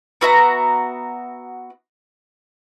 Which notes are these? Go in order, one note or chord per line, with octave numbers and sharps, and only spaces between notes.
B3 F#4 E5 A#5